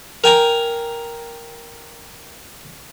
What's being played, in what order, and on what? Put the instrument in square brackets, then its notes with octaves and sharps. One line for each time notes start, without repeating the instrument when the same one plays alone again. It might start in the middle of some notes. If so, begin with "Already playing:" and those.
[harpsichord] A#4 G5 G#5 A#5